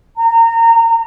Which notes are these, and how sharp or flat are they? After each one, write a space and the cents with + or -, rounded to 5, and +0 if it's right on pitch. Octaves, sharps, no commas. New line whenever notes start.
A#5 -25